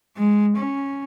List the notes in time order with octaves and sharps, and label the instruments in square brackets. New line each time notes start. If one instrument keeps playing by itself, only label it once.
[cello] G#3
C#4